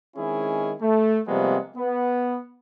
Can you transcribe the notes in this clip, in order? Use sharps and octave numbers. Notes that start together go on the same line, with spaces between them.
D#3 G#3 C4 C#4 E4 G#4
A3
C3 F3 G3 G#3 A#3 B3
B3